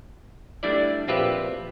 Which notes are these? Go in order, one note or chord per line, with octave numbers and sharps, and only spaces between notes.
G3 A3 D4 E4 D5
A#1 C4 F4 G4 B4 E5